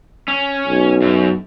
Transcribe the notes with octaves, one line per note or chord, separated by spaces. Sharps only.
C#4
B1
F#2